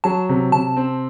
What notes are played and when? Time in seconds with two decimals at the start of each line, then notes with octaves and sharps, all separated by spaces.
0.04 F#3 A5
0.29 C3
0.52 C3 A5
0.77 C4